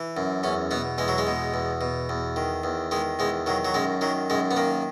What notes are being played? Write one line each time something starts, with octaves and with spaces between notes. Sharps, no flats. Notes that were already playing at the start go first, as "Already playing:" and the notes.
Already playing: E3
F#2
E2 C#4
B2 B3
E2 G#3
F#3
G#3
B2
E2
B2
E2
D#3
E2
D#3 G#3
E2 G#3
D#3 F#3
F#3
F#2 G#3
D#3 F#3
F#2 G#3
B3
D#3 A#3